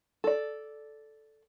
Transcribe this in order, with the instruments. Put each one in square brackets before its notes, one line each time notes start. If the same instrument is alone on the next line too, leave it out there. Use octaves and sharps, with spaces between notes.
[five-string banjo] A4 D5